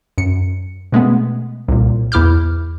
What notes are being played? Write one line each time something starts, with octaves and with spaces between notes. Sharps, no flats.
F#2 C#7
B2 G#3 A3 B3
C2 A#2
E2 E4 D6 F6 G6